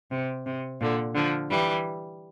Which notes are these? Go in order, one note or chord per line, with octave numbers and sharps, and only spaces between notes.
C3
C3
A#2 D3
D3 F3
E3 G3